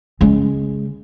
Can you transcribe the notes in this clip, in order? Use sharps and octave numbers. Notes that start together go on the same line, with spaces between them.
C#3 G#3